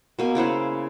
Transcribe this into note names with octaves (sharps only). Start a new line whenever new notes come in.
B2 A#3 G#5
C#3 E4 C5 F#5